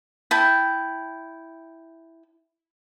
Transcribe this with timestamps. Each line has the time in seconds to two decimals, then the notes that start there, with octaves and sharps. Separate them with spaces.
0.31 E4 G5 A5